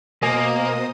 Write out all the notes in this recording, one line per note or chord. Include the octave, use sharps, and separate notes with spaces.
B2 A#3 C5 D#5 G#5 D#6